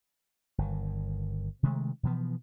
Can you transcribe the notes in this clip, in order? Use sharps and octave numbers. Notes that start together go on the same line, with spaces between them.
G1 D#3
C3 D#3 G#3 A3
B2 E3 F3 B3